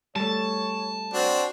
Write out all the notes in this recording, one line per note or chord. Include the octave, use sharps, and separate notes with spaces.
G3 A3 C#5 A5
C4 D4 F#4